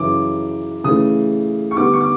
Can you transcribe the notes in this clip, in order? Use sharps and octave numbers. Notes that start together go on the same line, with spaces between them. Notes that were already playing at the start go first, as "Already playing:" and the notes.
Already playing: F#2 C#3 E3 D6
C#3 E3 A3 D#6
C#6
D3 G3 B3 D6
C#6
D6